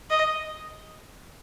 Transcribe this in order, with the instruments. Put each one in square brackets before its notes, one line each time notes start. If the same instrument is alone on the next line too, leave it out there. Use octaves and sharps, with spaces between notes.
[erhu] D#5